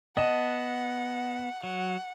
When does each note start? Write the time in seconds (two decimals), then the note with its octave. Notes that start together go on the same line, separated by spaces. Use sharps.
0.17 B3 D#5 F#5 A5
1.63 F#3 F#5